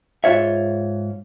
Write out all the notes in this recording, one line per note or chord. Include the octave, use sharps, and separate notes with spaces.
G#2 F4 C#5 E5